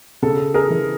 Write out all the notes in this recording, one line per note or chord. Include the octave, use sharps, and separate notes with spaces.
C#3 A4
G#4 A#4
E3